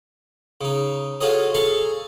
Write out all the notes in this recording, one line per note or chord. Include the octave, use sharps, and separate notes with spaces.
C#3 D#4
F4 F#4 G#4 A4 C#5 D#5
G#4 A4 F5 A#5 C#6